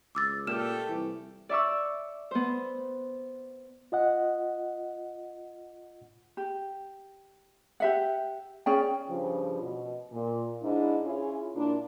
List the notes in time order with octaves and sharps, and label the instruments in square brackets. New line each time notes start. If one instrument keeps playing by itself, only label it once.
[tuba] C#2 [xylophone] D6 E6 A6
[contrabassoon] A#2 [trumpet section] A3 G4 A4 [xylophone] F6 E7
[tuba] C2 [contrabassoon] E3
[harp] D5 E5 C#6 E6
B3 C5
[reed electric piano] F4 D#5 F#5
[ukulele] G4
G4 E5 F#5
C#4 G#4 D5 G5
[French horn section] G2 C#3 F3
B2
A#2
G#2 D4 E4
C#4 E4 F4 G#4
A#2 A#3 D4 E4